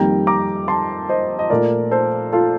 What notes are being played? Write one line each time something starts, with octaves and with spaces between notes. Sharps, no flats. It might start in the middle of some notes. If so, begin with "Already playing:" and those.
Already playing: F2 D#3 G3 A#3 G5 A#5
A#5 D6
A5 C6
C5 D#5
D#5
A#2 A3 A#4 D5
A4 C5
F4 A4